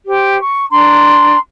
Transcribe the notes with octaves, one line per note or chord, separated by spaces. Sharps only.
G4 C5
C#6
D4 A#5 C6